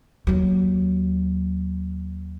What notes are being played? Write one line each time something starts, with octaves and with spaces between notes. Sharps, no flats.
D#2 F#3